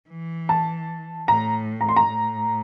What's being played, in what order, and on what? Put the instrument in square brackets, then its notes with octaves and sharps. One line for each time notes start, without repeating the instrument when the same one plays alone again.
[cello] E3
[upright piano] A5
[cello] A2 [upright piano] A#5
[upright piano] A#5
C6
A#5
[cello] A2